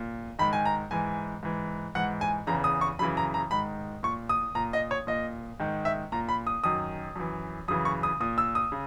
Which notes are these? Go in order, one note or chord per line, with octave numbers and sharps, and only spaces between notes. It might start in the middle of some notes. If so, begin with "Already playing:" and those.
Already playing: A#2
G#2 D#3 B5
G#5
A#5
G#2 E3 G#5
G#2 E3
G#2 E3 F#5
G#5
E2 C#3 E3 A#5
D#6
C#6
F#2 C#3 E3 B5
A#5
A#5
G#2 D#3 B5
A#2 C#6
D#6
A#2 A#5
D#5
C#5
A#2 D#5
G#2 D#3
E5
A#2 A#5
B5
D#6
F#2 D#3 D#6
F#2 E3
F#2 C#3 E3 D#6
C#6
D#6
A#2 D#6
E6
D#6
C#3